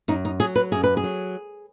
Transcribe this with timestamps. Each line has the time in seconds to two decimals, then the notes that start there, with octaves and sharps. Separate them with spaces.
0.08 F#2 D#4
0.25 D#4
0.40 F#3 G#4
0.56 B4
0.72 F#2 G#4
0.84 B4
0.97 G#4
1.04 F#3